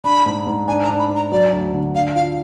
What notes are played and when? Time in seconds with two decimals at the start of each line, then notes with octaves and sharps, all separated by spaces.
0.04 D4 B5
0.26 G#2
0.47 G#2
0.68 D4 G#5
0.84 A#5
0.89 D4
0.99 B5
1.10 D4
1.16 A#5
1.32 F#3 D5
1.53 D2
1.74 D3
1.95 D4 F5
2.15 F4 F5